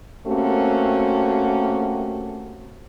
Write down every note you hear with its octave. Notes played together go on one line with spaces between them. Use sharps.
A3 A#3 C4 C#4 F#4 G4